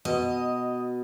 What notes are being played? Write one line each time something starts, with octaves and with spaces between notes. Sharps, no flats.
B2 D#5